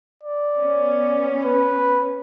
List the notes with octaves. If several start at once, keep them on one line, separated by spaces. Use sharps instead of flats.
D5
B3 C#4
B4